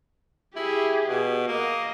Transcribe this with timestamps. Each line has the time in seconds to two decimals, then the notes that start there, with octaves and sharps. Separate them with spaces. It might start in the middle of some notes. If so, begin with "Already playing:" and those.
0.56 E4 G4 G#4
1.07 B2
1.47 A#3 D#5